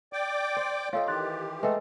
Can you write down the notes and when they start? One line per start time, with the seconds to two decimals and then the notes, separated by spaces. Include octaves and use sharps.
0.13 D5 G5 D6
0.57 C5
0.93 F4 A4 C#5 D#5 F5
1.08 D#3 E3 G4 C6 F#6 A6
1.63 G#3 A3 A4 B4 E5 G5